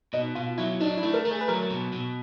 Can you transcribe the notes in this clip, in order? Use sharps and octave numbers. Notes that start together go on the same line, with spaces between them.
B2 D#4
B2 F4
F#3 E4
D4 D#4
E4
A3
A#4
A3
G#4
B4
F#3 A#4
B2
B2